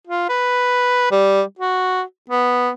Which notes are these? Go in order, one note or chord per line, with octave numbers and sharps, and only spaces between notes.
F4
B4
G3
F#4
B3